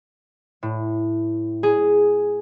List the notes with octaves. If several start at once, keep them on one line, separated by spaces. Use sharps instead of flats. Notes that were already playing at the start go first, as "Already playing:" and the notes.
A2
G#4